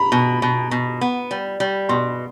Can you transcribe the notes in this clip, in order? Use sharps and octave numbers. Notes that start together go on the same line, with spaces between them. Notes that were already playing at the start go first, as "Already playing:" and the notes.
Already playing: A#5 B5
B2
B2
B2
B3
G3
G3
B2 C6